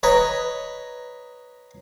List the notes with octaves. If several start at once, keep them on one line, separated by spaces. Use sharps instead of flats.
B4 C#5 D#5 A#5